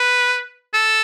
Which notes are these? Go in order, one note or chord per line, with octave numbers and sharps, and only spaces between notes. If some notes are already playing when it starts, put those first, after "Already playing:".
Already playing: B4
A4